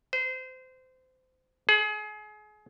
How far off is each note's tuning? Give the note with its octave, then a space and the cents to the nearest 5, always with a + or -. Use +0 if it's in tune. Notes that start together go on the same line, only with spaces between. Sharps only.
C5 -25
G#4 +30